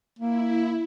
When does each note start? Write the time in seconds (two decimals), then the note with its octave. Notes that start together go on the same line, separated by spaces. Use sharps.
0.19 A#3 E4